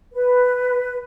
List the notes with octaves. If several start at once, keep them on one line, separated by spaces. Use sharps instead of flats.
B4